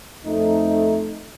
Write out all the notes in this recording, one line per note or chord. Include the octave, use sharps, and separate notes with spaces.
F2 A3 D#4